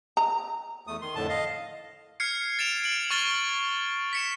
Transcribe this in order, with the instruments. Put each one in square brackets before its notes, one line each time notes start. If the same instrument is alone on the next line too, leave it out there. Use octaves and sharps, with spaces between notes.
[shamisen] A#5
[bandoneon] E2 A3 D#6
D#3 C6
F2 A2 D3 A5
D#5 F5
[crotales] F6 G#6 C7 C#7
A6 D7 E7 F7
D7 F#7
C#6 F6 A6 F#7 G7
B6 C#7 E7